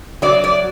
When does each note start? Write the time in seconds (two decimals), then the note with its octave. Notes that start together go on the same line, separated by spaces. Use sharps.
0.22 F#3 D5
0.44 D5